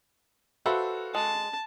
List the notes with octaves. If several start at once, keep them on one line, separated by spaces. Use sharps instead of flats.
F#4 A4 B4 C5 E5 F5
G#3 A5